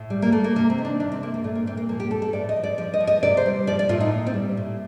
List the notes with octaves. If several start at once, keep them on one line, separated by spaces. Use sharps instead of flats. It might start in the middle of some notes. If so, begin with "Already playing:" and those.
Already playing: A2
G3
A#3
G3 A3
A#3
C3 A#3
C4
D#3
D4
C3 D4
C4
C3 A#3
A#3
A#2 A3
A#3
A#2 C4
A#3
F3 A#3
G4
F3 A4
A4
A2 D5
D#5
F3
D5
F3 D5
D#5
F3
D#5
C3 D5
C5
G3
F3 D5
D5
A2 F4
D#4
A#2
C4
G3
A2